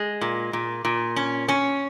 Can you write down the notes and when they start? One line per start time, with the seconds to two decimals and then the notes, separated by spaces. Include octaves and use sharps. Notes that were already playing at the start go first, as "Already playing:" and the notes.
Already playing: G#3
0.21 A#2
0.53 A#2
0.85 A#2
1.16 C#4
1.48 C#4